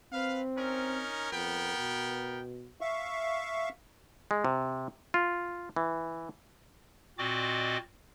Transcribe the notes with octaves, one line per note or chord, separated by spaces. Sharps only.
C4 B4 F5
C#4 D#4 A#4
F2 B3 A#4 G5
B2
E5 F5 C#6
G#3
C3
F4
E3
A#2 C4 F#4 D5 D#5 D6